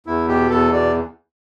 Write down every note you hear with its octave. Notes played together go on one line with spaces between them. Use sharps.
E2 E4
B2 G4
E2 A4
B2 D5